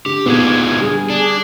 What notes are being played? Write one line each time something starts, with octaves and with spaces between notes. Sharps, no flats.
D3 G4
A#2 D3 D#3 B3 G#4 B4 G#6
D3 G3 G#4
D4